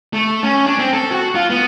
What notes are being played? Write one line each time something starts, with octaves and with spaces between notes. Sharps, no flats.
A3
C#4
D4
C4
A4
F#4
F4
B3